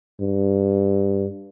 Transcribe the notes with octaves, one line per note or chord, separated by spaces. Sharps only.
G2